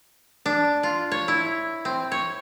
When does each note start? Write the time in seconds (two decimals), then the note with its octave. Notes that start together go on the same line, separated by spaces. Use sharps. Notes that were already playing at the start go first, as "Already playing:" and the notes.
0.46 D4
0.83 F4
1.12 C#5
1.28 E4
1.85 C4
2.12 C#5